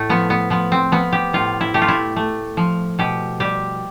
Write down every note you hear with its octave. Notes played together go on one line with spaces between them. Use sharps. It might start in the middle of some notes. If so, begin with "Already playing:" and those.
Already playing: A2 A3
F3 B3
B3
F3 B3
C4
F3 B3
G4
A2 F4
E4
A3 G4
F4
E4
A3
F3
B2 G4
G3 G4